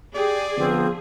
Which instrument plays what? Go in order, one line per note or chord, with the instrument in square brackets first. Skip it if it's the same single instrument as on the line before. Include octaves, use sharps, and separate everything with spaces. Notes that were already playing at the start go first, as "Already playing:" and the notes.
[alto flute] G4 [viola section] G#4 [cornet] D5
[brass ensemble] D3 F3 B3 [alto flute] C4